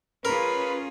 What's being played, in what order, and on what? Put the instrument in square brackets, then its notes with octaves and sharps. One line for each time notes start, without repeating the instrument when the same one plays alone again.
[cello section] C#4 F4 G#4 [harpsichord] A#4 [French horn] B4 [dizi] B5